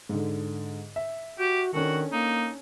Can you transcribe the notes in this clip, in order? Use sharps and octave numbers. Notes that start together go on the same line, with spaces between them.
G#2 D3
E5
F#4 G4
D#3 C#4 D4 F#4 A4
A#3 D#4